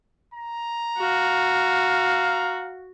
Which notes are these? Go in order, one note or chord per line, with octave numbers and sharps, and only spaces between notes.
A#5
F#4 F5